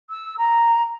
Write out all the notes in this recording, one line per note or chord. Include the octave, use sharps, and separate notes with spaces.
E6
A#5